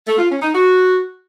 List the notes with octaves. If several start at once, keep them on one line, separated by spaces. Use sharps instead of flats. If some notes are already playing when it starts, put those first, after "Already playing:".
A3
F4
C#4
D#4
F#4